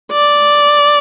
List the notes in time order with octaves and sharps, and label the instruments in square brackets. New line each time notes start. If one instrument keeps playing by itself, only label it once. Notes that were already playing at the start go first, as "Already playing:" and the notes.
[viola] D5